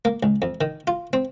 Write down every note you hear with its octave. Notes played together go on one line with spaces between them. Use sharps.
A#3
C#2
F2
D#3
F4
C4